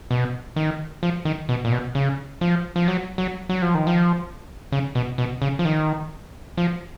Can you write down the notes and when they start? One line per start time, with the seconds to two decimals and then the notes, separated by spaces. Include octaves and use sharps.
0.11 B2
0.56 D#3
1.03 F3
1.25 D#3
1.49 B2
1.65 A#2
1.72 B2
1.95 C#3
2.41 F3
2.76 F3
2.88 F#3
3.18 F#3
3.49 F#3
3.62 F3
3.75 D#3
3.87 F3
4.72 C#3
4.95 B2
5.18 B2
5.42 C#3
5.59 F3
5.65 D#3
6.57 F3